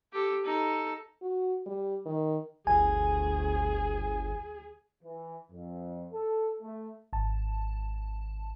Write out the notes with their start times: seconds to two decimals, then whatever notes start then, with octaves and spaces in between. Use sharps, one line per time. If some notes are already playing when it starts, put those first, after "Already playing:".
0.13 G4 A4
0.45 D#4 A4
1.22 F#4
1.66 G3
2.06 D#3
2.67 G1 D2 G#4 G#5
5.03 E3
5.52 F2
6.13 A4
6.61 A3
7.13 G#1 A5